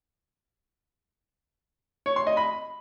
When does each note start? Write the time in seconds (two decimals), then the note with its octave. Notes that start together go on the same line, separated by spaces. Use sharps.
2.06 C#5
2.16 C6
2.27 D#5
2.37 B5